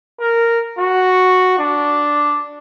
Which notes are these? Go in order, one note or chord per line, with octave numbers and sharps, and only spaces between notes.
A#4
F#4
D4